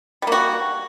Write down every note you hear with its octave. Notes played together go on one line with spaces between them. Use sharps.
G3 A#3 F#4